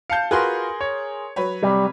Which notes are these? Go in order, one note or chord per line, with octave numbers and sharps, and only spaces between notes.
F5 A5 G6 C#7
F4 F#4 G#4 A#4 B4 C6
C#5
F#3 B4 C#5
C3 G3